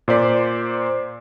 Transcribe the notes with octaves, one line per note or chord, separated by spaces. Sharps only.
A#2 C5 D5 B6